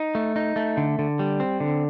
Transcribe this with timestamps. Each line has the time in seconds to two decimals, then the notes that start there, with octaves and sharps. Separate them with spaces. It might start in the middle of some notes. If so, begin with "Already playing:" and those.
Already playing: D#4
0.15 A3
0.36 D#4
0.56 A3
0.77 D3
0.99 D3
1.19 G3
1.40 C4
1.60 D3